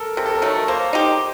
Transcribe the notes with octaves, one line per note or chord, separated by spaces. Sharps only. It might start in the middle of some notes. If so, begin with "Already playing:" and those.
Already playing: A4 A#4
C3 A#4
A4
A#4
D#3 F#3 A3
A#3 C5
D#4 G4